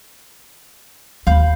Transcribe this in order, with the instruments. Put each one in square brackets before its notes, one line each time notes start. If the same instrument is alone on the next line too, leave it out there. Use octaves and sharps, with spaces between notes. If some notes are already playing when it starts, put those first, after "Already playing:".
[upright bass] D#2 [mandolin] F5 B5 G6